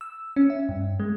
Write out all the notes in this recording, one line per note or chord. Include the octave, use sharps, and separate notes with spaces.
E6
C#4
E5
G2
G#3